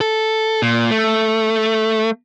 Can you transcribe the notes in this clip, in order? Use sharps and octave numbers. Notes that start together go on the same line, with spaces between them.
A4
A#2
A3